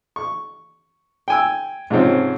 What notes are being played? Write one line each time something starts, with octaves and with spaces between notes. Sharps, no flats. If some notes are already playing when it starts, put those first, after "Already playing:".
C#6
G5 G#5 E6
G#2 C3 F3 C4 C#4